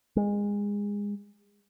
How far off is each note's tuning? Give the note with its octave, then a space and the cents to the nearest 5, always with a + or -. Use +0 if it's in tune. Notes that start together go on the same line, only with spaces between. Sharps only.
G#3 -25